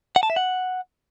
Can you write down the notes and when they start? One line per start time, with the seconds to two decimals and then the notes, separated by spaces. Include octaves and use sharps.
0.16 F#5
0.23 A5
0.30 E5
0.36 F#5